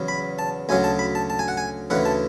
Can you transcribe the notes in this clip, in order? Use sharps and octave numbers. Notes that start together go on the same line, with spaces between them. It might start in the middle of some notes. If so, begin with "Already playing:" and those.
Already playing: E2 C#3 F#3
B5
A5
D2 C#3 F#3 G#5
A5
B5
A5
A5
G#5
F#5
G#5
D2 C#3 E3 F#5
A5